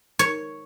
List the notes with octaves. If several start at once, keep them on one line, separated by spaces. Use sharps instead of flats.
C#5